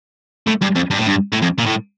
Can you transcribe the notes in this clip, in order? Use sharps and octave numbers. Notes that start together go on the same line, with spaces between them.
A2
G2
F2
G2
A2
G2
A2
F2
A#2
A2